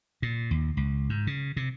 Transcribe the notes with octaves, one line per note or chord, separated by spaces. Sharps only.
A#2
D#2
C#2
G#2
C#3
C3